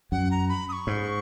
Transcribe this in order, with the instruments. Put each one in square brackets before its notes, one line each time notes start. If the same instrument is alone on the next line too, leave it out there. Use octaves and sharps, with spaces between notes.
[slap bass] F#2 [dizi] F#5
[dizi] A#5
B5
D#6
C#6
[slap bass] G#2